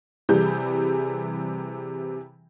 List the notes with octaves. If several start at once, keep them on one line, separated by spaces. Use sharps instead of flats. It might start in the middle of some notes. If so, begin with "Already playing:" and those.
C3 E3 G3 G#4 G6